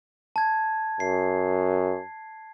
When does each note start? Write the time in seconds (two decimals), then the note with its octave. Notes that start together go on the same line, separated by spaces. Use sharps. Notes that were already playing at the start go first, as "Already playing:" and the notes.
0.36 A5 G#6
1.00 F#2 C7